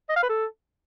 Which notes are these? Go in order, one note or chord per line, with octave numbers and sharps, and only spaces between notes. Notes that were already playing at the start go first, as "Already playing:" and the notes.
D#5
F5
B4
A4